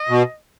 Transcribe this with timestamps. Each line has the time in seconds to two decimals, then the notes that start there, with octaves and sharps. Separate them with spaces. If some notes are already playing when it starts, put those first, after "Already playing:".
Already playing: D#5
0.09 B2